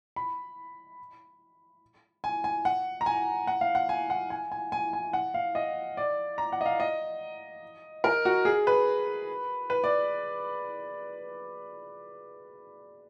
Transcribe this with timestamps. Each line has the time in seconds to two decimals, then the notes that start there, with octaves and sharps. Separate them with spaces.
0.16 B5
2.24 G#5
2.44 G#5
2.65 F#5
3.01 A#5
3.06 G#5
3.47 F#5
3.61 F5
3.75 F#5
3.89 G#5
4.10 F#5
4.30 G#5
4.52 G#5
4.72 G#5
4.93 G#5
5.13 F#5
5.34 F5
5.55 D#5
5.97 D5
6.38 A#5
6.52 F#5
6.61 D#5
6.66 F5
6.80 D#5
8.04 A#4
8.25 F#4
8.45 G#4
8.67 B4
9.70 B4
9.84 D5